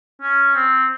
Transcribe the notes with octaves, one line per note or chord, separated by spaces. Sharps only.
C#4
C4